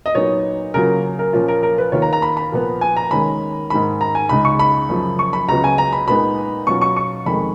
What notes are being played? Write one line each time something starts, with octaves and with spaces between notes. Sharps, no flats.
D#5
A#2 F#3 B3 D#4 C#5
C#3 F#3 A#3 F4 A#4
A#4
A#2 F3 A#3 C#4 F4
A#4
A#4
B4
D#2 D#3 A#3 F4 C#5
A#5
A#5
B5
B5
A#2 F3 B3
G#5
A#5
D#2 D#3 G#3 C#4 B5
G#2 D#3 G#3 B5
A#5
G#5
C#2 C#3 G#3 D#4 B5
C#6
B5
F#2 C#3 F3
C#6
B5
C#2 C#3 F#3 B3 F4 A#5
G#5
A#5
B5
A#2 G#3 B3 D#4 B5
B2 F#3 C#4 F4 C#6
C#6
C#6
F2 D#3 G#3 B5